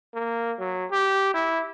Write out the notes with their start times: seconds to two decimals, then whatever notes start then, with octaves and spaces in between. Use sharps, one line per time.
0.14 A#3
0.59 F#3
0.91 G4
1.34 E4